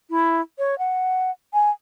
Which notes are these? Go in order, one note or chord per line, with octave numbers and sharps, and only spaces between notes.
E4
C#5
F#5
G#5